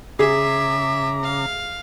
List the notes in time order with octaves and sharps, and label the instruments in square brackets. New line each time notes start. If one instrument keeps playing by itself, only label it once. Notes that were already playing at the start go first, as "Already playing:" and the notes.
[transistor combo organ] C#3 A#5 [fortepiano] G#4 [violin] E5 [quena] D6
[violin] F5